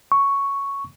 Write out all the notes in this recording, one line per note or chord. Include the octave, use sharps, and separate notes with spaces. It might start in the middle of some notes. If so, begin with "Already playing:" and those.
C#6